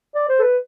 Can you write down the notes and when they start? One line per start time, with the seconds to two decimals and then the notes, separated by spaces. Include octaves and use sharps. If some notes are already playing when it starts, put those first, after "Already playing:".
0.15 D5
0.29 C5
0.39 A4
0.42 B4